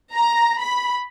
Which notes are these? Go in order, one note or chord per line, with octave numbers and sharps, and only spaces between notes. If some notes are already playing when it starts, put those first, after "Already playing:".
A#5
B5